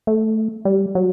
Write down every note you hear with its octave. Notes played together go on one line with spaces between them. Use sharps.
A3
G3
F#3